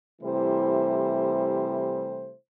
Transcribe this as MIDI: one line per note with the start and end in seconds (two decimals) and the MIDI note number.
0.22 2.32 48
0.22 2.32 52
0.22 2.32 55
0.22 2.32 57
0.22 2.32 64
0.22 2.32 72